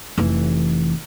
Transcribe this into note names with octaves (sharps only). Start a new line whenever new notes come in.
F1 E3